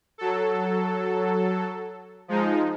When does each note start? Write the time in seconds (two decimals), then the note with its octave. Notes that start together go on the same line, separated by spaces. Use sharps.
0.18 F#3 A4
2.28 F3 G#3 D#4